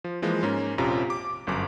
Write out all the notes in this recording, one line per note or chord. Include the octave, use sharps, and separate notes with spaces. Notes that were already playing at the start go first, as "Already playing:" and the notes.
F3
E3 F3 G#3 A#3
G#2 A#3 C#4
A#1 F2 C3 C#4 F4 A#5
D6
G1 F#2 D6